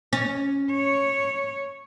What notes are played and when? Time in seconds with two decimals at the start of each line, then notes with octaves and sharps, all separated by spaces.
0.13 C#4
0.71 C#5